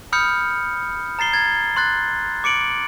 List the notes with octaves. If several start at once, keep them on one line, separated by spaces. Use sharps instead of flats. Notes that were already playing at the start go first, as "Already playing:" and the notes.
B5 D#6 F6 G6 C#7
A#5 A6 C7 G7
G#6 A6
C6 F#6 A6
D6 C#7 D7 F#7